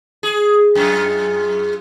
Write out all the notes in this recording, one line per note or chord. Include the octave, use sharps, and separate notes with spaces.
G#4
F#2 G#3 F4